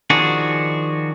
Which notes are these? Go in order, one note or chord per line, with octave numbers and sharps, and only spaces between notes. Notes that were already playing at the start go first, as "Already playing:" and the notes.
D#3 F3 D4 F#4 G#4